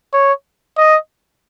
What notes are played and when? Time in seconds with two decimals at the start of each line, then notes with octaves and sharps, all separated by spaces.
0.14 C#5
0.78 D#5